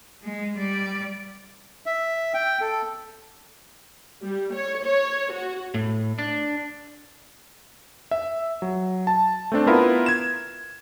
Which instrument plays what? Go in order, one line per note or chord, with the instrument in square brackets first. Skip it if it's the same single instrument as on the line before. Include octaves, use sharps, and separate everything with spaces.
[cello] G#3
G3 D5
[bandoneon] E5
G5
A4
[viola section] G3
C#5
C#5
F#4
[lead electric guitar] A2
D4
[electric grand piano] E5
F#3
A5
A3 C4 D4
B3 E4 F4 A#4 B4
G#6 E7